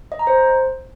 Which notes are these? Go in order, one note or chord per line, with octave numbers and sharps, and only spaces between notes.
D#5
A#5
C5